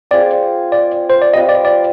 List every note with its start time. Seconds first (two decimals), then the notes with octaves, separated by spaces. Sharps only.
0.11 C4 F4 G#4 D5
0.72 D5
1.10 C5
1.22 D5
1.34 G3 C4 F4 B4 D#5
1.49 D5
1.65 D5